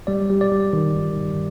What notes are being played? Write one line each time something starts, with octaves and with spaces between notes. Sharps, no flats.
G3 D5
G3
D5
G3
D#3
G1
G1